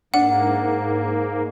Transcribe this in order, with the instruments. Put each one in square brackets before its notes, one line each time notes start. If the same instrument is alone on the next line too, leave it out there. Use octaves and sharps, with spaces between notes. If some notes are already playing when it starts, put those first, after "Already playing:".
[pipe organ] G#2 A#3 [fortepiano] D4 [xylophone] F#5